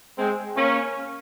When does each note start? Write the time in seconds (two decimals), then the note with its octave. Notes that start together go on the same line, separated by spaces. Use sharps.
0.18 G#3 C4
0.56 A#3 C#4